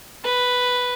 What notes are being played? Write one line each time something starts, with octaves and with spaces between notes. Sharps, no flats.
B4